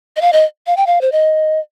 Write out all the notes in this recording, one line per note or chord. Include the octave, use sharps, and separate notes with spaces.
D#5
F5
D#5
F5
G5
F5
C5
D#5